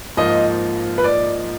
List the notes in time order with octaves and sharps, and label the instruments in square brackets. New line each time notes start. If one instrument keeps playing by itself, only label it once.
[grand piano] G#2 F3 A#3 D#4 A#4 [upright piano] D#5
[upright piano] B4
D5